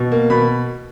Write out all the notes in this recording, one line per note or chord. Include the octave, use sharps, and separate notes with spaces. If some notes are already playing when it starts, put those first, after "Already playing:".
Already playing: B2
A#3
B2 B5